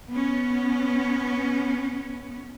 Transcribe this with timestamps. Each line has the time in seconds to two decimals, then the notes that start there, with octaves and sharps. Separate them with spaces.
0.10 B3 C#4